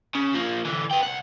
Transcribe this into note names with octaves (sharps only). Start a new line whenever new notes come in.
C#3
F3 A#3
D3 E3
B4 G5
C2 F#5